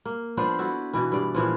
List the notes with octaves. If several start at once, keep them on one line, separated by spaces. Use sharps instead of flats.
A#3
F3 B3 D4 C5
E4 F#4 A4
B2 E3
G2 D5
A#2 E3 F3